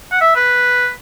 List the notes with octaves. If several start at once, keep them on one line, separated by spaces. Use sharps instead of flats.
F#5
E5
B4